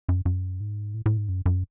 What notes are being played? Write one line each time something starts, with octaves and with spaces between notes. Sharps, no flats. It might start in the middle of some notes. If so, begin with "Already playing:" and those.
F#2
F#2
G#2
A2
A2
G#2
F#2
F#2